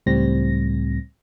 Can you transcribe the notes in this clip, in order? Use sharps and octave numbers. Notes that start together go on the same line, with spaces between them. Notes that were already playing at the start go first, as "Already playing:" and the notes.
C#2 A2 G3 C4 A#6